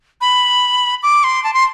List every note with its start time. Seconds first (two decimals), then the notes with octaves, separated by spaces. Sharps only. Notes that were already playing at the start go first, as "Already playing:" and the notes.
0.21 B5
1.03 D6
1.24 C6
1.44 A5
1.54 C6